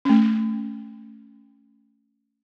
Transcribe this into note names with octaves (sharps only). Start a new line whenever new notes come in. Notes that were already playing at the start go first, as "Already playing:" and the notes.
A3 C#4